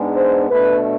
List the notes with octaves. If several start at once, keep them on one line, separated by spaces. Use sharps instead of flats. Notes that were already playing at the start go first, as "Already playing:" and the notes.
Already playing: G#2 G#3 B3 D4
C5
B2 A3 D4 B4